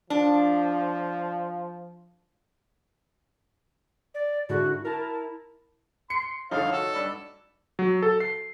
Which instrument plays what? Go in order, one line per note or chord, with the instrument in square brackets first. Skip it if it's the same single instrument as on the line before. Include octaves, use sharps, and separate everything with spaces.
[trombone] F3 [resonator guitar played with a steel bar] D4
[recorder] D5
[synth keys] G#2 D3 E4 [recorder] F#4
[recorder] E4 [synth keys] A#4 A5
[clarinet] C6 [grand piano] C#7
[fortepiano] C2 F2 D3 [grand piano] D#4 [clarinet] C#5 [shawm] F5
[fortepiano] F#4 [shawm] A4
[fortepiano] G2 B5 E6 [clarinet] D5
[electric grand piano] F#3
A4
C7